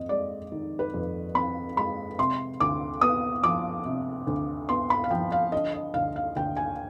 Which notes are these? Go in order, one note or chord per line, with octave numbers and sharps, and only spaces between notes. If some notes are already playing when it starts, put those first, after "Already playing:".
Already playing: F2 C4 D#5
G#3 D5
D#3
B4
F2
C4 B5
G#3 B5
C3 C6
D2 D6
B3 D#6
F3 D6
C3
D2
B3 C6
B5
F5
F3 G5
F5
D3 D#5
D#5
D2 F5
F5
D2 G5
G#5